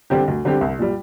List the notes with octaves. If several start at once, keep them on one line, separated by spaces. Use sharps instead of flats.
D3 G3 C4 G4
D2
D3 G3 C4 G4
C2
A#2 G3